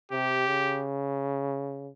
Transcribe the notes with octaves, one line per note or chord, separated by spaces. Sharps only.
C3 G4
C#3